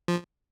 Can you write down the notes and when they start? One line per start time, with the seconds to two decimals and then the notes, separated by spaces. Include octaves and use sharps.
0.08 F3